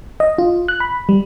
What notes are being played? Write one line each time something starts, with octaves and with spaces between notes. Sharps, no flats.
D#5
F4
F#6
B5
G3